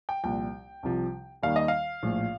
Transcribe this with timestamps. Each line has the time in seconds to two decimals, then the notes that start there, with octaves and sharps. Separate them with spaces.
0.09 G5
0.23 C2 A#2 F3 G5
0.83 C2 C3 F3
1.43 D#2 D#3 G3 F5
1.56 D#5
1.68 F5
2.03 A#1 A2 F3